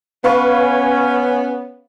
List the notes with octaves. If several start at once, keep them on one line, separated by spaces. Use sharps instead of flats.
B3 C#4 B4 F5 C#6